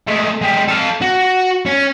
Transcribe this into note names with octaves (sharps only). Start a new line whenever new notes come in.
G#3 A3
G#3 G4
A4 F5
F#4
C#4